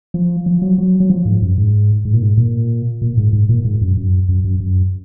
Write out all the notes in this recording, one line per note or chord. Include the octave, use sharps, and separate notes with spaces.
F3
F3
F#3
F#3
F#3
F3
G#2
F#2
G#2
G#2
A#2
G#2
A#2
A#2
G#2
G#2
A#2
G#2
F#2
F#2
F#2
F#2
F#2